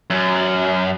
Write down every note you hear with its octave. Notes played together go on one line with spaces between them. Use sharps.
F#2